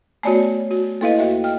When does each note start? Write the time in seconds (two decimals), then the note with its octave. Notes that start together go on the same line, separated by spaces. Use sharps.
0.23 A3 B3 F#4 C#5 D5 G#5
0.71 F#4
1.01 A#3 E4 A4 B4 D#5 F5
1.19 D#2 F#4 D#5 E5 G5
1.44 G5 F6